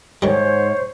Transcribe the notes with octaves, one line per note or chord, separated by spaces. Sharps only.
G#2 D#3 G3 C5 C#5